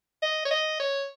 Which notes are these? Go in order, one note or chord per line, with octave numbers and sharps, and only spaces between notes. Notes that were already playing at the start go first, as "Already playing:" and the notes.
D#5
C#5
D#5
C#5